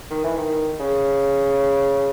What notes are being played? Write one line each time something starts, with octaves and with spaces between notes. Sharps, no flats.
D#3
E3
D#3
C#3